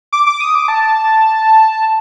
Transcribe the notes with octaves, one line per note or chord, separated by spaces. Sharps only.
D6
D6
D#6
D6
A5